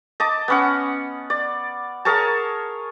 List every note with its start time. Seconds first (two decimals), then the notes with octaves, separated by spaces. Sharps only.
0.20 D#5 A5 D6
0.48 B3 C#4 F#5
1.30 D5
2.05 G#4 A#4 C#5 A5